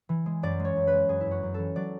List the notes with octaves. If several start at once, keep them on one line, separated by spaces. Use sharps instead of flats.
E3
G#3
F#2 D5
G#3 C#5
F#2
B4
G#3
F#2 G#4
F#2 E4
F#4
F#2
E3 A4
F#3 D5